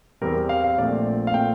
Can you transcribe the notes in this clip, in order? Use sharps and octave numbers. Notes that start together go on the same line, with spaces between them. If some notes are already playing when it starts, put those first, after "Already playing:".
E2 E3 G3 C4 A#4
F5
F5
A#1 A#2 A3 C4 D5
F5
A#2 A3 C4 G5